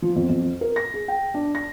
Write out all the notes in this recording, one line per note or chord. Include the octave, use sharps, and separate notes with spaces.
F3
F2
F2
A#4
A#6
G#4
G5
D4
A#6